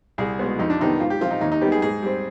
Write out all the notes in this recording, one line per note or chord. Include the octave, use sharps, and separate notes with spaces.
C2 G#4
B2 G#3 B3
F2 D#4
D4
C3 D#3 B3 D#4
G#2 F4
G4
F3 C4 F4
D#4
D#2 D#4
D#4
D#3 G3 B3 G4
G#4
G#2 G#4
G3 C4